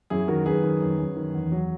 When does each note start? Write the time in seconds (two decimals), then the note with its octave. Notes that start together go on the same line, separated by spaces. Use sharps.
0.10 F#2 E4 G#4
0.28 D#3 F#4 A#4
0.46 F#2 G#4 B4
0.64 D#3
0.82 F#2
0.99 F#2
1.17 D#3
1.34 E2
1.52 F#3